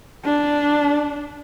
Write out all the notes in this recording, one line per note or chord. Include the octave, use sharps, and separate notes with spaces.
D4